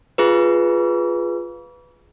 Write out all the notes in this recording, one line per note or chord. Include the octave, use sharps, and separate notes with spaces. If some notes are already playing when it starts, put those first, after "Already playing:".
F4 G#4 B4